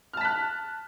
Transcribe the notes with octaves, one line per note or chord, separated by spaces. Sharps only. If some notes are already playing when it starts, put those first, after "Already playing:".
A5 F6 F#6 B6